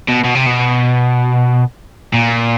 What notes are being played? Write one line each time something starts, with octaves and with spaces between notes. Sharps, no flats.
B2
B2
C3
B2
A#2